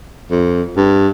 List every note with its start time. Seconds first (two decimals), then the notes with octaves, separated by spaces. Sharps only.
0.30 F2
0.76 G2